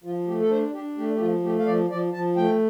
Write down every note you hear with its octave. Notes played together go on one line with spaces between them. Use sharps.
F3 F4
A3 G4
A4
D4 C5
D4 G4
A3 G4
G4
F3 F4
A3 G4
F5
F3 D5
F3 D5
F3 A5
A3 G5